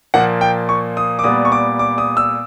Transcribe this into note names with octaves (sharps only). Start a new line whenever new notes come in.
A#2 F3 A#3 F#5
G5
C#6
D#6
D6
A#2 G3 B3 D#6
C#6
D6
D6
D#6
E6